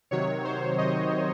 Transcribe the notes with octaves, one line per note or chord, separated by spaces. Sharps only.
C3 D#3 F#3 C#5
C5
D#5